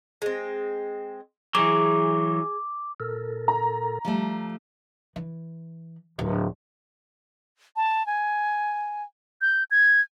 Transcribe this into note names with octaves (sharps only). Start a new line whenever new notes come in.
G#3 C4
E3 F#3 G#4 D6
A#2 A4 A#4
A#5
F3 G3 A3
E3
D1
A5
G#5
G6
G#6